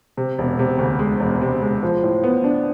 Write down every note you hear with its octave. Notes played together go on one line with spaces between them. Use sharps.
C3
E1
C3
D2
G#3
E1
C3
G#3
F3
A2
B3
D4